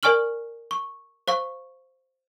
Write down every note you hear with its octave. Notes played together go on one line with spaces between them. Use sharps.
A#4 D5 G#5 C#6 F6 F#7
C#6
C5 F5 C#6